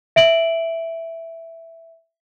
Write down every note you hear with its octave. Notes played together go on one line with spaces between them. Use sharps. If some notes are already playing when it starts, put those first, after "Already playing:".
E5 D7 F#7